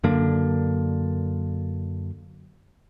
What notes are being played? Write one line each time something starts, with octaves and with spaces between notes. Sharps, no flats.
F#2 D3 A#3 D4